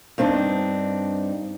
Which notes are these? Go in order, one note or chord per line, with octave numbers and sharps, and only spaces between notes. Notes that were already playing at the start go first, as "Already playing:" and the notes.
G2 C4 D4 D#4